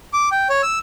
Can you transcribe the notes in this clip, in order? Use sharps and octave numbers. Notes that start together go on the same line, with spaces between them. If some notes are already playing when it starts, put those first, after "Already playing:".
D6
G5
C#5
E6